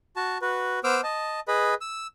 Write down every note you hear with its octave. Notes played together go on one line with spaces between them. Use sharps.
F#4 A5
F#4 B4
B3 C5 D6 E6 F6
D#5 A5
G#4 B4 D#5 B5
E6